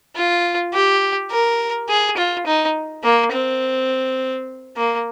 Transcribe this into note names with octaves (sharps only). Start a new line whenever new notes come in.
F4
G4
A#4
G#4
F4
D#4
A#3
C4
A#3